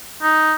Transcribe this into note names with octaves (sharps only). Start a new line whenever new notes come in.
D#4